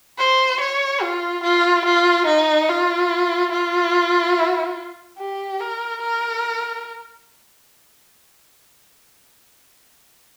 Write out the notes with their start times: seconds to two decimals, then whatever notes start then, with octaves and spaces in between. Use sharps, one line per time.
0.19 C5
0.60 C#5
1.02 F4
1.43 F4
1.85 F4
2.27 D#4
2.69 F4
3.52 F4
5.19 G4
5.60 A#4
6.01 A#4